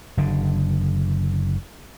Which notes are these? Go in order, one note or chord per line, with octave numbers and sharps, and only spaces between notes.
F#1 D3